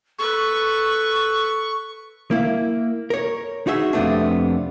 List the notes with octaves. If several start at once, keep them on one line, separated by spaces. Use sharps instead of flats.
A4 B4 C#6
A#3 E4
A#4 C#5
D#4 F#4 G#4 E5
F2 C3 A3 B3 D4